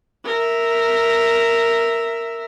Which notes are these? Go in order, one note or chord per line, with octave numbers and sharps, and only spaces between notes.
A#4 E5